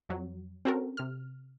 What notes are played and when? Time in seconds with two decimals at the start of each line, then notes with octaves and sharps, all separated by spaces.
0.09 F2 F#3
0.65 C4 C#4 F#4 A4 A#4
0.97 C3 F6